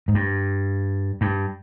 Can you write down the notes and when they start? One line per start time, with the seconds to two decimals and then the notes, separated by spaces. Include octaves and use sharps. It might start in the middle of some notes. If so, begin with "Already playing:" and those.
0.08 G#2
0.15 G2
1.21 G2